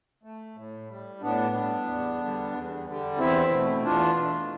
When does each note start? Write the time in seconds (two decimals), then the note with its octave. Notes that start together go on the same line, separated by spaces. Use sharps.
0.23 A3
0.56 A2
0.89 G3
1.22 A2 B3 D4
1.55 G3
1.87 E2
2.20 D3 G3
2.53 E2
2.86 D3 G3
3.18 E2 C4 E4
3.51 B2 A3
3.84 E2 D4 F4
4.16 B2 A3